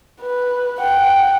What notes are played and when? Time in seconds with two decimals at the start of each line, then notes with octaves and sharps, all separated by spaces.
0.21 B4
0.81 F#5 G5